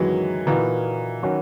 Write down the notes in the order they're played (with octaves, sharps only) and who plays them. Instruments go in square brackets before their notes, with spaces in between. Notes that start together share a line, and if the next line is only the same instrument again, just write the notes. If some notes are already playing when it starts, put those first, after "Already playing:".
Already playing: [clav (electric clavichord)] F#2 D#3 G#3 D#4 F#4 [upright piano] E3 F#3
[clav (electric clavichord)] A#2 A#3 D#4 F#4 A#4 [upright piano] E3
[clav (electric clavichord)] D#3 F#3 C#4 F#4